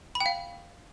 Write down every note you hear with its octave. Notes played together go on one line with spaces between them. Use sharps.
B5
G5
F5